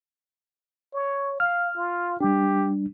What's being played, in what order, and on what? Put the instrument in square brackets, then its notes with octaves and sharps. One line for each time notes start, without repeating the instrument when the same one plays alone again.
[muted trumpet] C#5
[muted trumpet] F5 [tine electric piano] F6
[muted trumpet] F4
[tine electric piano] G3 D4 [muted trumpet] G4